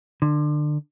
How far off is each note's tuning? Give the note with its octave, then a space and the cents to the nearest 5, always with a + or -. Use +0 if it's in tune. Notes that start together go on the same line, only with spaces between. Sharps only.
D3 +25